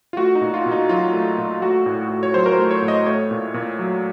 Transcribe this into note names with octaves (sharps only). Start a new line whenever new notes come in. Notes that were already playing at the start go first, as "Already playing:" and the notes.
F4
A3 F#4
D#4
A#2
F4
A#2
D#4
F#3 F4
A3
A#2
A3 F#4
A2
A2
C#5
F#3 C5
A#4
C5
A3
C#5
A2
D#5
A3 C#5
A#2
A#2
F#3